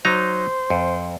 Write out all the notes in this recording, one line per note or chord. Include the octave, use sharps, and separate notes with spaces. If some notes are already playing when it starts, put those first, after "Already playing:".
F#3 D#4 C5 A#5
F2